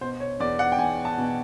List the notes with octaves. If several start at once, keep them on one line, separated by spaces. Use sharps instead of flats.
B2 C5
C#5
E2 D5
F#5
G5
E2 G#5
A5
B2